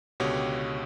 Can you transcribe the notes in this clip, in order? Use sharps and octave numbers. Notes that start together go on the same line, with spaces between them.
C#2 B2 D3 F#4 G4 C#5